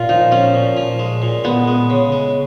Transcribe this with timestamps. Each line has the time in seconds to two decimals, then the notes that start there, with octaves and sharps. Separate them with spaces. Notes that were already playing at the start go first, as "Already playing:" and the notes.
Already playing: A#2 F4
0.09 F3 D#4
0.31 F3 C#4
0.54 A#2
0.77 F3
0.99 G#3
1.22 A#2
1.44 G#3 B3
1.68 G#3
1.90 C#3
2.12 G#3